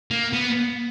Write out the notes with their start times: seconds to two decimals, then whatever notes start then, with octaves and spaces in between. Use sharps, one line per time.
0.11 A#3
0.33 B3